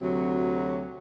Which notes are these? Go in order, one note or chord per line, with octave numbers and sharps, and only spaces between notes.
D2 C3 F#3